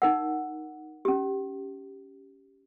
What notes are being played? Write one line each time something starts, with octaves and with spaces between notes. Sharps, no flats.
D#4 A#4 F#5
C#4 G4